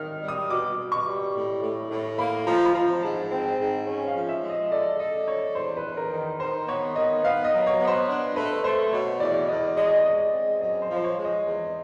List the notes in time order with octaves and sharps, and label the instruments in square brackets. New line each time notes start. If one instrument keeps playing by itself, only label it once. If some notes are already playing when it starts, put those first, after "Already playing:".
Already playing: [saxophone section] D#3 [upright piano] F6
[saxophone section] G3
[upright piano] D#6
[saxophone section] B2 [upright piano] D6
[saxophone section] B2
[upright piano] C#6
[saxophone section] G3
A2
A2
A2
[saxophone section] A#3 [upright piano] B5
[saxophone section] F3 [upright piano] A#5
[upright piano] B5
[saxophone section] F3 [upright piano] A#5
[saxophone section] G#2 [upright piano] A5
[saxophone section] C4
[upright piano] G5
[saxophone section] G#2
C#4
[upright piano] F5
[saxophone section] F3
[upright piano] E5
[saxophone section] G#3
[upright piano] D#5
[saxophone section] A4 [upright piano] D5
[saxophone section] A4 [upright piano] D#5
[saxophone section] D4 [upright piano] C#5
[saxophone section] E2 [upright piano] C5
[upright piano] B4
[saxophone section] E2
[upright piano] A#4
[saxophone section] D#3
[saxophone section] D#3 [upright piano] C5
[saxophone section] B3 [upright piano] C#5
[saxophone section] D#3 [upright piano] D#5
[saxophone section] B3 [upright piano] F5
[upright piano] D#5
[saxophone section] F#3
[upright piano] C#5
[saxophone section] B3
[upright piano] C5
[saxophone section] D4
[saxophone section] A3 [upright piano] B4
[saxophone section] A3 [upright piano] C5
[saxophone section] B2 [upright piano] C#5
[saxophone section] E2 [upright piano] D5
[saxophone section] E2 [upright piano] D#5
[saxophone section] G#3 [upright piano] D#5
[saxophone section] G#3 [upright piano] D#5
[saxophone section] C4
[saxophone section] F#2 [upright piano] D#5
[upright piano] C5
[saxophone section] F3
[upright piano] C5
C#5
[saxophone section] G#3
[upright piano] D#5
[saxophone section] E2